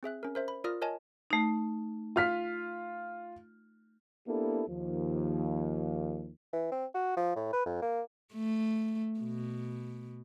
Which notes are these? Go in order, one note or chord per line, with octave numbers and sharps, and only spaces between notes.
C4 G#4 E5 F#6
C#4 A#4
A#4 C5 E5
B5
F4 A#4 D5 D#6 F6 A#6
A#4 C#5 D#5 G#5 A5
A3 D#4
F4 F6 B6
A#3 B3 D4 E4 G4 A4
D#2 F3
E3
C4
F#4
F3
A2
B4
F2
A#3
A3
B2